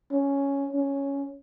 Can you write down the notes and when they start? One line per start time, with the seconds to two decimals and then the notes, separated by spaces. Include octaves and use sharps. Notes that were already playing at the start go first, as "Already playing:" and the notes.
0.12 C#4
0.73 C#4